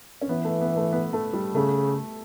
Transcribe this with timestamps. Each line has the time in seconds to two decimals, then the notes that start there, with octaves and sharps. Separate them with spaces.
0.21 C#4
0.29 E3 B3
0.45 A3
0.61 B3
0.77 A3
0.93 B3
1.13 A3
1.33 G3
1.54 C#3 A3